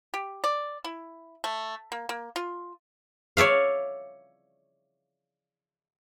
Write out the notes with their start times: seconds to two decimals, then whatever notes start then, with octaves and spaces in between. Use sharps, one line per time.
0.14 G4
0.44 D5
0.84 E4
1.44 A3
1.92 A#3
2.09 A#3
2.36 F4
3.37 C#5 D5 E5 F5